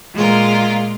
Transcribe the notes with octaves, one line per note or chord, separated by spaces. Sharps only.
A#2 G#3 F4 A#4